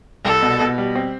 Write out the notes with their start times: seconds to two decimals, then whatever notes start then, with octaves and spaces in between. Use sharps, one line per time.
0.25 C2 A4
0.42 B2
0.61 B2
0.78 G3
0.95 C4